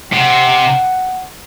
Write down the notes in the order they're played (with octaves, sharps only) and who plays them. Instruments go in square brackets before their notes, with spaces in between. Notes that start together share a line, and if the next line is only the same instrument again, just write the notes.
[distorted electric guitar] C3 [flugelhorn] F#5